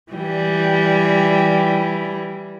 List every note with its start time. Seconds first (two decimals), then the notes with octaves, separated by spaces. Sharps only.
0.13 E3 G3